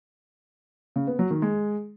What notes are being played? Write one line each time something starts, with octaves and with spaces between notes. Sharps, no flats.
C#3
B3
F#3
D#3
G#3